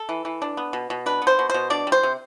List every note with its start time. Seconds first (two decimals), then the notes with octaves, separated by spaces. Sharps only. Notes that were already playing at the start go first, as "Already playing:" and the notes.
Already playing: A4
0.09 E3
0.25 E3
0.42 D4
0.57 B3
0.73 B2
0.90 B2
1.06 D4 B4
1.22 B3
1.27 C5
1.39 B2
1.50 B2 C5
1.70 D4 D5
1.87 G3
1.92 C5
2.03 C3